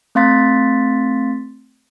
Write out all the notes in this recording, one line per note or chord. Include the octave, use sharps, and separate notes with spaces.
A3 C4 F5 C6 A6 B6